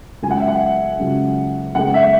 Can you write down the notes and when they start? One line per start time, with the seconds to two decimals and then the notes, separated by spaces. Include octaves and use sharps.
0.22 C#2 C#3 F#3 G#5
0.31 F#5
0.40 E5
0.48 F#5
0.99 C#2 C#3 F#3
1.75 F#2 C#3 G#3 B3 F#5
1.94 E5